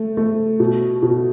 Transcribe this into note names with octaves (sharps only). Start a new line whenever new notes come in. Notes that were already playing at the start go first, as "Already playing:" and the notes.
Already playing: A3
A3
B2
B2